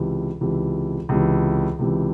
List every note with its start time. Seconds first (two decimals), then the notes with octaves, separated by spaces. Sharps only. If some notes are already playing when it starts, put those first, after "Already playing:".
Already playing: C#2 C3 E3
0.41 C#2 C3 E3
1.09 C#2 C3 E3
1.79 C#2 C3 E3